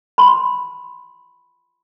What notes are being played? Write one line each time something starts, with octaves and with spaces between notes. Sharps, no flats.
B5 C6